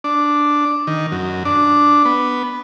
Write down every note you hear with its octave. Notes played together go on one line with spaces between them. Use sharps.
D4
D#3
F#2
D4
B3